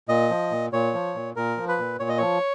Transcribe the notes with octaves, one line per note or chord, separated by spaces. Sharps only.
A#2 D#5
F3
A#2
A#2 C#5
F3
A#2
A#2 A#4
F3
B4
A#2
A#2 C#5
D#5
F3 C#5